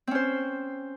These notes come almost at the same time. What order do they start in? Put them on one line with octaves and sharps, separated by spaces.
C4 C#4 C5